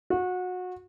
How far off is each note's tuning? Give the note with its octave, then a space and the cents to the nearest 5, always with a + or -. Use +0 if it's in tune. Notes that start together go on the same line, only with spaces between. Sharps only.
F#4 -25